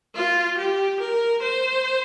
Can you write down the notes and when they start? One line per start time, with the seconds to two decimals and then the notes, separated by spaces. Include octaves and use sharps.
0.15 F4
0.57 G4
1.00 A#4
1.42 C5